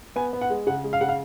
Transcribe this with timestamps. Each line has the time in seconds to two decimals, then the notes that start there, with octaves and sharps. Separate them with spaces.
0.16 B3 G#5
0.33 B3
0.41 F#5
0.50 G#3
0.67 C#3 F#5
0.84 G#3
0.93 F5
1.01 C#3 F#5
1.08 F5